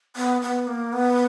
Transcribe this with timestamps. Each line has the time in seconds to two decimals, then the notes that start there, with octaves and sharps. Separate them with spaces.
0.16 B3
0.41 B3
0.67 A#3
0.93 B3